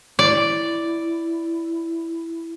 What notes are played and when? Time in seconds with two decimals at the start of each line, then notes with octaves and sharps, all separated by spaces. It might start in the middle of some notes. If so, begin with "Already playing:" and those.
0.19 E4 D5